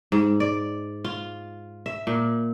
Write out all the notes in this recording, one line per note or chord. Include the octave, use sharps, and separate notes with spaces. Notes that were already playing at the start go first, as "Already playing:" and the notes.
G#2
D5
F4
E5
A#2